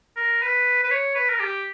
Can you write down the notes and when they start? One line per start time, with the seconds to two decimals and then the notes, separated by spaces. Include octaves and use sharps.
0.16 A#4
0.42 B4
0.83 B4
0.91 C#5
1.15 B4
1.29 A#4
1.40 G4